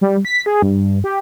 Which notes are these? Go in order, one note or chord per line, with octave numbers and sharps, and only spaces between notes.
G3
B6
G#4
G2
G4